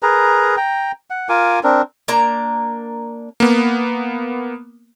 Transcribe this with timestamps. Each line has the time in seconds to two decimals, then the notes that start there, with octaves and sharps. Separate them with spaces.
0.03 G#4 A#4 B4 A#5
0.57 G5 A#5
1.10 F#5
1.29 F4 A#4 G#5 D6
1.63 C4 D4 A#4
2.08 A#3 D4 A#5
3.40 A#3 B3